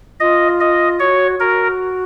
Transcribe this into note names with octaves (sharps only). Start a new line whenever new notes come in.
F4 D#5
D#5
F#4 C#5
F#4 A#4